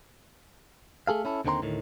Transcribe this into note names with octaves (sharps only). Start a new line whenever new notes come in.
A3 G#4 A4 F5
C#4 E4 A4
D#2 D3 D#3 C4 A#5 C6
D2 A2 D#3